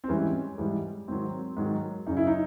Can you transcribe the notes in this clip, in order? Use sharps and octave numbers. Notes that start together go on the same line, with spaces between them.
C4
G#2 E3 G3 C#4
G#2 E3 G3
G#2 D#3 F#3 C4
G#2 D#3 F#3
F#2 C#3 F#3 D#4
E4
D#4